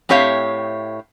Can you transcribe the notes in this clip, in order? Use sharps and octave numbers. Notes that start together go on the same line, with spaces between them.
A2 C4 G4 C#5 E5 F5